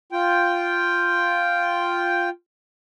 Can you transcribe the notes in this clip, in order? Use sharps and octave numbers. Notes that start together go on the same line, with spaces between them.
F4 G5